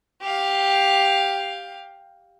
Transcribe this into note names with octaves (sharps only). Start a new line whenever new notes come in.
G4 F5